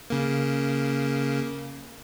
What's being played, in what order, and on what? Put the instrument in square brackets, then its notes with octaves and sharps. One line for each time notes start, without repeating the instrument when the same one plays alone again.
[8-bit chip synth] C#3 A#3